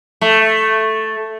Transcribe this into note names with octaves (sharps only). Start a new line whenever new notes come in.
A3